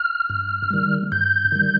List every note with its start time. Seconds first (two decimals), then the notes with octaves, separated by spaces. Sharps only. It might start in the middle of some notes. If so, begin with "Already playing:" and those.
Already playing: F6
0.29 G2
0.70 D#3 G3
1.12 G2 G6
1.52 D#3 G3